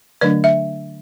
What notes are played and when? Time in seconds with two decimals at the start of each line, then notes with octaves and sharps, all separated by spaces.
0.21 D3 F#3 A3 D4 B4 D5
0.44 E5